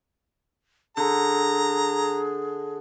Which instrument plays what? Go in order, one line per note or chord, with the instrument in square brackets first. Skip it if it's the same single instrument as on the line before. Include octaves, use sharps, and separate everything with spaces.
[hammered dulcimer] D3 [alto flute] G#4 [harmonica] A#5